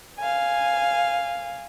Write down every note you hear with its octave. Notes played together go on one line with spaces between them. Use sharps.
F5 G#5